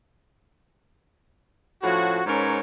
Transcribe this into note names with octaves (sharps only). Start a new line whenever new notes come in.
A2 F3 C#4 F#4
G#2 C#4 A#4 B4 C#5